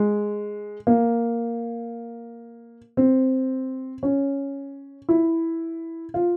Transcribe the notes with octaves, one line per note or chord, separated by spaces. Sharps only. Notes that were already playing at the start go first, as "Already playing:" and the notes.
Already playing: G#3
A#3
C4
C#4
E4
F4